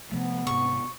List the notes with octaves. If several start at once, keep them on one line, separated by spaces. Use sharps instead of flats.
C3 F3 A3 B3
G#2 C3 C#6